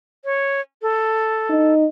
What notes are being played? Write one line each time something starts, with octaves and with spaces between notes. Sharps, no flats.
C#5
A4
D#4